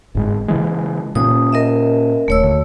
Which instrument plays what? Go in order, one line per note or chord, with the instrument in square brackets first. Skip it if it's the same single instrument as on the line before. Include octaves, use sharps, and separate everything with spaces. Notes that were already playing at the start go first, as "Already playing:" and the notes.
[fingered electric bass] G1 G#2 G#3
C#3 E3 G#3
[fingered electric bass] A#2 C4 C#4 [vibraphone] D#6
[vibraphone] A#4 D#5 E5
[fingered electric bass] D#1 [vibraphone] A3 C#5 E6
[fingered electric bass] D2